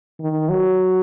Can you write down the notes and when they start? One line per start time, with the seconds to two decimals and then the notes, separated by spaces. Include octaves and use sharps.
0.20 D#3
0.49 F#3